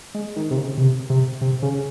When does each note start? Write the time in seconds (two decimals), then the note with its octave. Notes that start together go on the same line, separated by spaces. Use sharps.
0.15 G#3
0.36 D#3
0.51 C3
0.57 C#3
0.78 C3
1.10 C3
1.42 C3
1.62 C#3